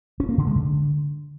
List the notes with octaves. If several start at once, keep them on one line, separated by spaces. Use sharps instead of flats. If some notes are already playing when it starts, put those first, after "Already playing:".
C#4
A#3
D3
G#3
D3